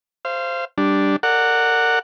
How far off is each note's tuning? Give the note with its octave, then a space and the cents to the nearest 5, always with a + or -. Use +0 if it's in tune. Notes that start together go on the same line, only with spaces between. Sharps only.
C5 +0 F5 -25
G3 +0 D4 +0
A#4 -30 D5 +0 F#5 +0